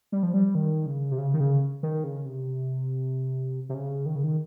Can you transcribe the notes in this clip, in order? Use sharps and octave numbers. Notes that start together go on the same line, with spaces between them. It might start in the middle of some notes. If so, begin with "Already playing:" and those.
G3
F3
G3
D#3
C#3
C3
C#3
D#3
C#3
D#3
C#3
C3
C3
C#3
D#3
C#3
D#3